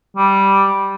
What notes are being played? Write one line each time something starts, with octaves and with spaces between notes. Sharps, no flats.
G3